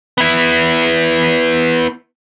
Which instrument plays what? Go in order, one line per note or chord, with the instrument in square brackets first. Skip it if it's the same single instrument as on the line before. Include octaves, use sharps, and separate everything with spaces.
[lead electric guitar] B3 E4